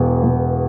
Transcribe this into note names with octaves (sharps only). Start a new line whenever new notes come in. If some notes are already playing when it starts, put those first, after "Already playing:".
Already playing: E1 E2
E1